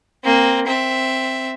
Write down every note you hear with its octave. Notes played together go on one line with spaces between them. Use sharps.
A#3 C4
C4 E5